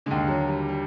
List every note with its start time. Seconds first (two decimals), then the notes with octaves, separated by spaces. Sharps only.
0.06 D#2 D3 G#3
0.28 F#3
0.48 G3
0.68 G3